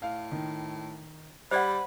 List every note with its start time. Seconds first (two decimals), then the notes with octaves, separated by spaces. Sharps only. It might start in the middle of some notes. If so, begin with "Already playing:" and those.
0.02 A2 F5
0.32 D#3
1.51 G3 C5 D5 F#5 B5